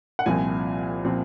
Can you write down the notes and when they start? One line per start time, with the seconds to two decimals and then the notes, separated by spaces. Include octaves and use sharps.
0.19 F#5
0.26 C2 A#2 F3 C4 G#5
1.04 A#2 F3 C4